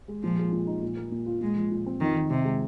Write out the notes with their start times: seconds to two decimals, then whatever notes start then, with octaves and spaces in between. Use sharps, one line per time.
0.08 G#3
0.23 A#2 F3
0.38 G#3
0.52 A#2
0.67 D#4
0.82 A#2
0.97 A#3
1.12 A#2
1.26 F4
1.41 A#2 G#3
1.56 F3
1.72 A#2
1.86 C4
2.01 F2 D#3
2.16 D#3
2.30 C3 D#4
2.45 G#3